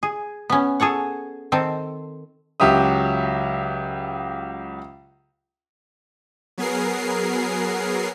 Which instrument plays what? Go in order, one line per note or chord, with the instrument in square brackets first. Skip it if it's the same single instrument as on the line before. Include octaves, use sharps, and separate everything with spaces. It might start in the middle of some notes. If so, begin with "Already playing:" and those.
[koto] G#4
B3 C#4
G#4 A4 C#5 F#5
D#3 C4 A4
[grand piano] C#2 F#3 G4 E5 D#6
[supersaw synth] F#3 B3 G#4 A#4 C7